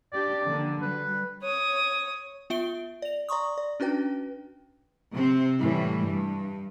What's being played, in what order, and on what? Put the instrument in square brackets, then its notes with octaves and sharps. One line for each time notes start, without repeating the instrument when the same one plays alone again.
[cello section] D4 G4 [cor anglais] D5
[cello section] D3 F3 A#3
[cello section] F#3 G3 [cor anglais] B4
[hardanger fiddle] C#5 D#6
[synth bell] B3 F4 E5 D7 G7
D5 F7
D5 A#5 C6 C#6 D#6
D5
C#4 D4 F#4 B4 G5
[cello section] C3 C4
A2 E3 G3
G2